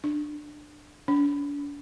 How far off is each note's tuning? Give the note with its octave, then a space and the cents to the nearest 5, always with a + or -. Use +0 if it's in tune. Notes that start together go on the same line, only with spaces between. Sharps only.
D4 +20
D4 -40